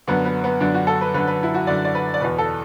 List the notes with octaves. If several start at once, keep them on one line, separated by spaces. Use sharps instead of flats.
F#2 D3 B3
B3
B3
F#2 D3 D4
F#4
A4
B4
F#2 D3 B4
B4
E4
F#4
F#2 D3 D5
D5
B4
D5
E2 B2 B4
A4